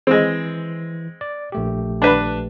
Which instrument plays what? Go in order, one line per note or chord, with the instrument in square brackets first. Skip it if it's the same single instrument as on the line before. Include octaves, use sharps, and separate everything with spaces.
[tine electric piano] E3 [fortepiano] G#3 C4
[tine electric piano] D5
A#1 A3 G4
[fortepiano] D4 B4